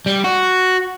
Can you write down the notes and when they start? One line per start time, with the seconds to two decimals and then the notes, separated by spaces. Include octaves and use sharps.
0.06 G3
0.24 F#4